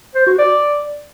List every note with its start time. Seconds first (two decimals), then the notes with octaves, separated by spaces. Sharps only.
0.15 C5
0.27 F#4
0.38 D5